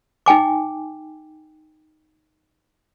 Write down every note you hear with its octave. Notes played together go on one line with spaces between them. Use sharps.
D#4 G5 G#5 D6